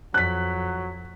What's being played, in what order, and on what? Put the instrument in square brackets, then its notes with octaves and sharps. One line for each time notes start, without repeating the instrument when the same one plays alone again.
[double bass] F2 [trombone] F#3 [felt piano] F#6 B6